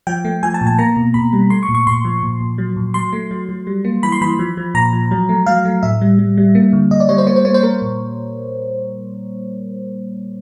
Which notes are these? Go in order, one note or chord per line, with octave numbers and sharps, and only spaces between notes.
F3 G5
A3
F3 G#5
A5
A#2
A5
A#3 A#5
B2
B2 B5
G3
A3 C6
C#6
A#2
C#6
A#2 C6
F3
A#2
A#2
F#3
A#2
F#3 C6
A3
F#3
F#3
G3
A#3
E3 B5
C6
E3 B5
F3
F3
A#2 A#5
F3
F#3
A3
F#3 F5
A3
A2 E5
G3
G3
G3
A#3
D3
D3 D#5
D5
G3 C#5
C5
A#3 C#5
C5
A#3 C#5
C5
A#3 A#4
A#2